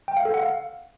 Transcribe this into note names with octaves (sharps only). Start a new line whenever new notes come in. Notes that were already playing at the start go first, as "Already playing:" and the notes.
G5
F5
A4
F#5
F5